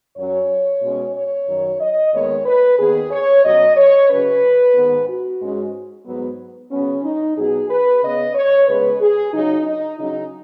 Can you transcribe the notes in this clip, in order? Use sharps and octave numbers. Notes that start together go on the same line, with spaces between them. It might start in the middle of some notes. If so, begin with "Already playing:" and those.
F#2 F#3 C#4 C#5
B2 G#3 C#4
C#5
F#2 D#3 F#3
D#5
D#2 D#3 G#3 B3 C#5
B4
D#2 D#3 B3 G#4
C#5
B2 F#3 C#4 D#5
C#5
C#3 F#3 C#4 B4
G#2 D#3 B3
F#4
G#2 G#3 C#4
G#2 F#3 B3
C#3 F#3 B3 C#4
D#4
B2 F#3 B3 G#4
B4
C#3 B3 D#5
C#5
C#3 G#3 B3 B4
G#4
C#3 F#3 C#4 D#4
D#4
C#3 F#3 C#4 D#4